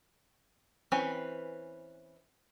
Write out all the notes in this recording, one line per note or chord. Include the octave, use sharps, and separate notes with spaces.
E3 C4 C#4 B4